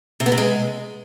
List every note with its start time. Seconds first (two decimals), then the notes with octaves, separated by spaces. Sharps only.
0.20 C3
0.26 B3
0.32 C3
0.38 G#3